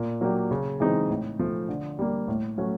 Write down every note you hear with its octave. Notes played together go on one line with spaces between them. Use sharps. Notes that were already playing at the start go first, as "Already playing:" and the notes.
Already playing: A#2
F#3 A#3 D4 G4
C#3
E3 G#3 C4 D#4
A2
F3 A3
D3
G3 A#3
A2
F#3 A3 C#4 F#4